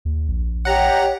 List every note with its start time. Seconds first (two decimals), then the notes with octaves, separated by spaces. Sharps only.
0.05 D#2
0.28 A#1
0.65 G4 C#5 D#5 F#5 A#5